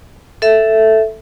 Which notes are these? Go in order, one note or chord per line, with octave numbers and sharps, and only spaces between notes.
A4 E5